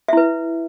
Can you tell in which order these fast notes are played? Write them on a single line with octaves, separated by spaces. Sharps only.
E5 E4 B4